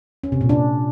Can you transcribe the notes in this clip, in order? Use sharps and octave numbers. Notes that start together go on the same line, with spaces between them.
C#4
C3
A#2
D4